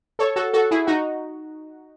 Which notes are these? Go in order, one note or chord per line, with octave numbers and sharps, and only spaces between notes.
A4 C#5
F#4 A4
F#4 A4
E4 G#4
D#4 F#4